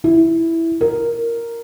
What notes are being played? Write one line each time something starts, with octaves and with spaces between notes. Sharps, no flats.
E4
A#4